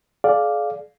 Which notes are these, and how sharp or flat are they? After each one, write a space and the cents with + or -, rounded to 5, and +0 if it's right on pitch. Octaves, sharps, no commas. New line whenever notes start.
G#4 +40 D5 +0 F5 +0